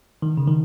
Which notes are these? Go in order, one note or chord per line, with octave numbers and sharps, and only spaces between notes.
D#3
C#3
D#3